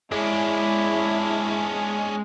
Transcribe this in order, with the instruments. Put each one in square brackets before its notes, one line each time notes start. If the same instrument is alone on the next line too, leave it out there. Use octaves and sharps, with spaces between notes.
[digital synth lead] G#3 [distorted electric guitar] C#4 D4 [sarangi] E4